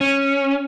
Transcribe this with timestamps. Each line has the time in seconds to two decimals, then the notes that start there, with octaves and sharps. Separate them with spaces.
0.01 C#4